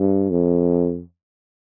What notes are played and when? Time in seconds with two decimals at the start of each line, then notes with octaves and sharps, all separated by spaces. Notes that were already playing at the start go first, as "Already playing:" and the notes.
Already playing: G2
0.30 F2